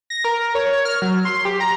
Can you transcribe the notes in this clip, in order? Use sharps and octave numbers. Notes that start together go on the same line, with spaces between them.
A#6
A#4
C#5
C#5
F6
F#3
C6
G4
A#5